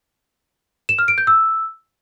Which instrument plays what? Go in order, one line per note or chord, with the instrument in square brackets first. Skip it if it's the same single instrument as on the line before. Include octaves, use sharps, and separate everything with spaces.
[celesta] E7
F6
D7
G6
E6